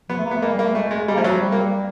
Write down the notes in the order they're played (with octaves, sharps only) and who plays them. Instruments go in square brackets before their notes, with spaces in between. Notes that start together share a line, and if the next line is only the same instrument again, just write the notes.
[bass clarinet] F3 [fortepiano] B3
[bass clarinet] A3
A#3
[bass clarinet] A3 [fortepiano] B3
[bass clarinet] G#3 [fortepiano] A#3
[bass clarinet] G3
[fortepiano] A#3
[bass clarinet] A3
[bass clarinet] G#3 [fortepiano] A3
[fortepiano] G#3
[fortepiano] G3 [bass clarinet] G#3
[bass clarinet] A#3
[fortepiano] F3 [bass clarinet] A3
[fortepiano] F#3
[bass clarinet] G3
[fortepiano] A#3